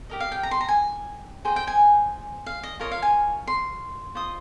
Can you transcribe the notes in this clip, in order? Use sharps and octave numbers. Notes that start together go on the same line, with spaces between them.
G4 A#4 D#5
F5
G5
A#5
C6
A#5
G#5
G#4 C5 D#5 G5
G5
G#5
F5
D#5
F4 A#4 C#5 D#5
F5
G#5
C6
F4 C5 D#5 D#6